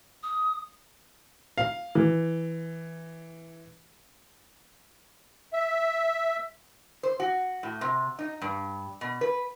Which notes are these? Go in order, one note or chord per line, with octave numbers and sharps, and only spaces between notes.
D#6
F5
E3
E5
C5
F#4
A2
C3
D#4
G2
B2
B4